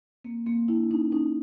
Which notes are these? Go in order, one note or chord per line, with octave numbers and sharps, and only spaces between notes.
A#3 C4
A#3 C4
D4 E4
C#4 D#4
C#4 D#4